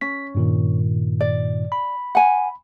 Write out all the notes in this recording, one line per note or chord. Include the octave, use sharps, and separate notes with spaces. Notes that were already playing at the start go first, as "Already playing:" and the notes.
C#4 B6
G2 A#2 D#3
D5
B5
F#5 G#5